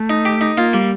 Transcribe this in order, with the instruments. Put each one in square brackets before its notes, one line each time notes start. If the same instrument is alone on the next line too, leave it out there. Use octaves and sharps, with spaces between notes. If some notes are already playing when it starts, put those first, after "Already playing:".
Already playing: [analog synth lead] A3
[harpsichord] D#4
G4
D#4
[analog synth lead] A#3 [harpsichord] F4
[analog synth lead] G3 [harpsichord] A#3